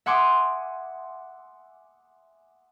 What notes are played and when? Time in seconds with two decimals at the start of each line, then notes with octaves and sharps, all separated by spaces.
0.06 E5 F#5 G#5 C6 D6 D#6